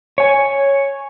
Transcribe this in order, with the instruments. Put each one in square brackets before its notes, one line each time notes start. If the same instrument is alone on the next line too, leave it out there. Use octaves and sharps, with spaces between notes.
[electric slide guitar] C#5 G#5